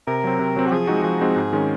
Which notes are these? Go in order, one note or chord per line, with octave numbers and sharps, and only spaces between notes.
C3 A#4
F#3 C4
C3
F#3 C4
F#4
F3 G#4
G#3 C4 D#4 F#4
F3 G#4
G#3 C4 D#4 F#4
G#2
D#3 G#3 C#4